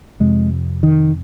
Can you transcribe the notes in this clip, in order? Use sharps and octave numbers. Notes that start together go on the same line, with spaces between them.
F2 C3 G#3
D#3